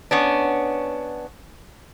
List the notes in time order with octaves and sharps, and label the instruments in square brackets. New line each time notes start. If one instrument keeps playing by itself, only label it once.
[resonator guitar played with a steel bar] B3 C#4 D4